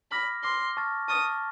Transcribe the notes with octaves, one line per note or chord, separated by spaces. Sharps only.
B5 D6 F6 A#6
C6 D6 F6 A#6
A5 C#6 F6 A6
A5 C#6 D#6 F6 A6